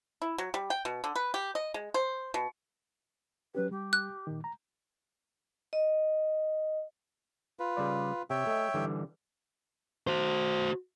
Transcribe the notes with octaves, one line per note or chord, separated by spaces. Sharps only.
E4
F#3
G3
G5
B2
D3
B4
G4
D#5
G#3
C5
B2
F#3 C#4 G4 B4
G3 G4
F#6
A#2 D#3
A#5
D#5
F4 B4
C#3 G3 D5
C3 C#5 E5 G5
A3 D#5
D3 E3 G3
F#4 C5